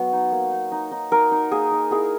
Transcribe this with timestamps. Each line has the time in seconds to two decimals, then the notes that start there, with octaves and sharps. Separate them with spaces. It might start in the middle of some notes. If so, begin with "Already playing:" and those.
Already playing: F#3 B3 C#5
0.12 D#4
0.32 A#3
0.52 D#4
0.72 D#4
0.91 D#4
1.12 D#4 A#4
1.32 D#4
1.51 A#3 G#4
1.71 D#4
1.91 E4 G#4